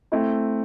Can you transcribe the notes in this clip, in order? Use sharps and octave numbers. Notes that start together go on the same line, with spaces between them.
A3 C4 E4